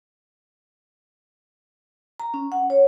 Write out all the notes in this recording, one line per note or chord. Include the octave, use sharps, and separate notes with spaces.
A#5
C#4
F#5
C#5